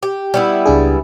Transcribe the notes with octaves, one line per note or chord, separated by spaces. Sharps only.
G4
G3 B3 E4
C#2 D4 G#4